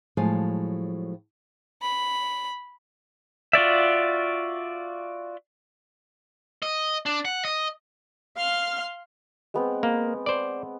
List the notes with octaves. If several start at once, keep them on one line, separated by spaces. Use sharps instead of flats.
A2 F3 F#3 G#3 F5 G#5
B5
F4 F#4 D5 E5
D#5
D4
F#5
D#5
F5 C6 F6
G#3 B3 C4
A#3
C5 D5